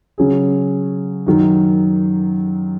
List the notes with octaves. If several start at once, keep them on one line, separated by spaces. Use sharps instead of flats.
C#3 F#3 C#4 G#4
F#2 D#3 F#3 D#4